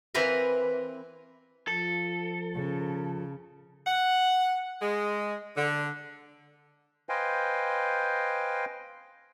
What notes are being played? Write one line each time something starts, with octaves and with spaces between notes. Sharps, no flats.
E3 C4 A#4 B4 F5
F3 A4
C#3
F#5
G#3
D3
B4 C5 D#5 F5 G5 G#5